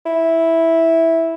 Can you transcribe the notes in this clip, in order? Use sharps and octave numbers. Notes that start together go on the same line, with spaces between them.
E4